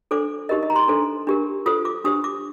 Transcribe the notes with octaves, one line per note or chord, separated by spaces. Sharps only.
D4 A4 C5 D6
D#4 G4 A#4 D#5
D#5
A#5
C6
D4 A4 C5
D4 G4 A#4
F4 A4 C5 D#6
D6
D4 G4 C5 D#6
D6